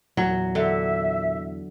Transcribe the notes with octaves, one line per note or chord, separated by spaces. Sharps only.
E2 A#2 F#3
D3 E5